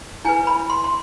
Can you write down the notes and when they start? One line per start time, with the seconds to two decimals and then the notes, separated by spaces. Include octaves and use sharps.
0.25 E4 B4 G#5
0.47 B5
0.70 C6
0.84 C6